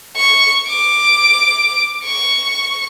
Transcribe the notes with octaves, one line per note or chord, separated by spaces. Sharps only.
C#6
D6
C#6